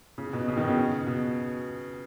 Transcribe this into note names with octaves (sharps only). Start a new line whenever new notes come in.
C#3
B2
C#3
B2 D#3
C#3
B2